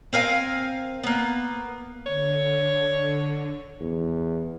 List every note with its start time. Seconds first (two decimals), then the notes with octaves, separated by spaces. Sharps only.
0.13 C4 A#4 F5 G#5
1.03 A#3 B3
2.06 D3 C#5
3.80 E2